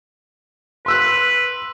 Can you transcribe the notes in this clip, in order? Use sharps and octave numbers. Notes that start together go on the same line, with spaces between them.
B4 C6 E6 F#6